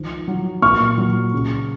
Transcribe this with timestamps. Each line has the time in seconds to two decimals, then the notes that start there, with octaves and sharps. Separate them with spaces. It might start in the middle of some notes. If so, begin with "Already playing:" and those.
Already playing: D#3 F3
0.28 F#3
0.62 A#2 C#6 F6
0.98 F#3
1.34 C#3